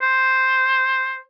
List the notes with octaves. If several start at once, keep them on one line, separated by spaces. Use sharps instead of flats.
C5